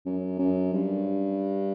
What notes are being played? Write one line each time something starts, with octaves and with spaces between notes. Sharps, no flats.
F#2
F#2
G2